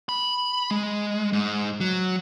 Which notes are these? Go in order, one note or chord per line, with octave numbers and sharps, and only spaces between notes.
B5
G#3
G#2
F#3